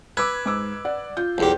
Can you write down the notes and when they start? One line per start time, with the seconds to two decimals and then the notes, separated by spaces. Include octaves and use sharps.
0.17 B4 D6 E6 G#6
0.46 G#2 D6 E6
0.85 D5 F#5
1.17 F4 G6
1.38 B1 E2 G4